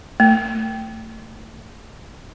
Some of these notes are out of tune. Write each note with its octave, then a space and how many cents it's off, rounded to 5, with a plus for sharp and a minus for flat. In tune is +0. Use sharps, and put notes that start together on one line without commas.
A3 +20